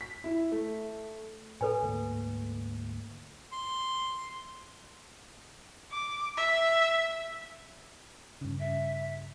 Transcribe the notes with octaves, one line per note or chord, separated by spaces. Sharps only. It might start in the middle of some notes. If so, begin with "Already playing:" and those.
B6
E4
A3
A2 A4 B4 G#5
D2 G#2 A#3
C6
D6
E5
G2 C#3
E5